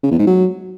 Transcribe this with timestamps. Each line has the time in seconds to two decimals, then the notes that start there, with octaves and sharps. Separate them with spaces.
0.03 C#3
0.11 E2
0.19 G#2
0.27 F#3